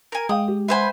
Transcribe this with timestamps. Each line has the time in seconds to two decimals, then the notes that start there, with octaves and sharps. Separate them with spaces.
0.12 A#4 G#5
0.29 G#3 F5 G5 D#6
0.48 G4
0.68 B4 C5 E5 F#5 G#5 B5